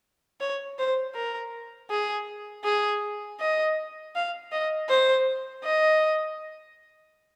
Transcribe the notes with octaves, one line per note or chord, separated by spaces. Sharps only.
C#5
C5
A#4
G#4
G#4
D#5
F5
D#5
C5
D#5